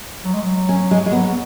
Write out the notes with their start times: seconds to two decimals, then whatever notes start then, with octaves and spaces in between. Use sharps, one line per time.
0.25 F#3
0.33 G#3
0.42 F#3
0.69 C#4
0.91 G#3
1.06 G#3
1.12 F#3 B3